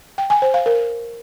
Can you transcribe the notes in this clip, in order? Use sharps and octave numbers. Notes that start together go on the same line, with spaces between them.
G5
G#5
C5
F5
A#4